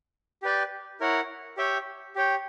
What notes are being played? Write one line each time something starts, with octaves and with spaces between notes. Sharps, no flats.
G4 B4 D5 G5
E4 A#4 C#5 F#5
G4 C#5 E5 G5
G4 C#5 G5